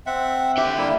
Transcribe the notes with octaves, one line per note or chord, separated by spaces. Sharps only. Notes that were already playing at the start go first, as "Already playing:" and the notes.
C4 E5 F#5
D3 G4 E5
G3 A#3 E4